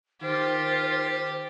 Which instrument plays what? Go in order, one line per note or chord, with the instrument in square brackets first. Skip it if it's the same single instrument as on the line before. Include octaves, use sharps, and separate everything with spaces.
[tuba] D#3 [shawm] F4 [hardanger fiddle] G4 [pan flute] C5